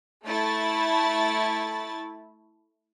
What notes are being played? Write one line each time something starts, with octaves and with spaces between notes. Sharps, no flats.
A3 E4 A6